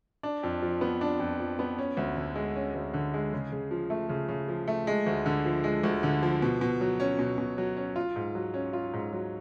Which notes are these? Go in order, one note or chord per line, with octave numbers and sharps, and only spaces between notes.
D4
F2
F3
B3
D4
F2
F3
B3
C#4
D2
D3
G#3
C#4
D2
D3
G#3
C#3
C#3
F3
A3
C#3
C#3
F3
A3
G#3
D2
D3
F3
G#3
D2
D3
F3
B2
B2
F#3
C#4
B2
B2
F#3
C#4
F4
G#2
F#3
C#4
F4
G#2
F#3